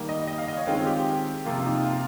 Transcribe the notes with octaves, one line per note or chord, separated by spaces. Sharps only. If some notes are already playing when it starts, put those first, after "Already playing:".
Already playing: D#3 G3 A#3
D#5
D#5
F5
D#5
C#5
D#3 G#3 C4 F4
G4
C3 F3 A#3 F4
F4
D#4
F4